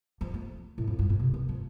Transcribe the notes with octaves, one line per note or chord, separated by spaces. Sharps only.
F3
A3
A2
F2
G2
A2
C3
D#3
F3